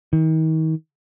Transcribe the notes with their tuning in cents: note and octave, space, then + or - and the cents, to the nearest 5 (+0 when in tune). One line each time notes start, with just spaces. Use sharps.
D#3 +40